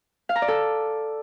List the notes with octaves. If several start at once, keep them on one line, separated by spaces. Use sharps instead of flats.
F5
A#5
D5
A4